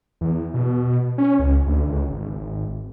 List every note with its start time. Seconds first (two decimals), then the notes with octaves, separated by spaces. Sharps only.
0.21 E2
0.54 B2
1.18 C#4
1.39 C#2
1.66 D2
1.89 C#2
2.11 G#1